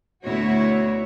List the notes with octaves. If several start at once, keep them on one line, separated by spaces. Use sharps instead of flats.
D2 B2 E4 F#4 C#5